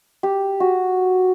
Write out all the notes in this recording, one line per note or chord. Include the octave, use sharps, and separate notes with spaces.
G4
F#4